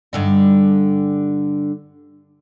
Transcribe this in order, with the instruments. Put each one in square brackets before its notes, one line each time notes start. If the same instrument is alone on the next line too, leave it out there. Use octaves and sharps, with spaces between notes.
[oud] G2 D3 D#4